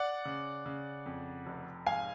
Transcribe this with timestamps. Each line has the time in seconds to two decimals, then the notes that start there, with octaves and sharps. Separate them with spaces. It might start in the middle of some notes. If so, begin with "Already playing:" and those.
Already playing: D5 F#5
0.25 C#3
0.66 C#3
1.06 F2
1.46 F1
1.86 G#2 F5 G#5